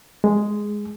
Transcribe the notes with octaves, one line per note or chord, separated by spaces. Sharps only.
G#3